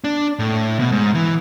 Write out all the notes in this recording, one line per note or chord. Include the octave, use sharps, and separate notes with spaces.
D4
A2
B2
G#2
E3